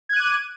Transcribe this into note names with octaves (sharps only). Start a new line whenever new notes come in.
D6 F#6 G#6 D#7